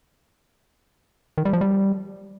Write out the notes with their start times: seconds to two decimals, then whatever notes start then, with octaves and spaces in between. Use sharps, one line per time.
1.38 D#3
1.45 G3
1.53 F3
1.61 G3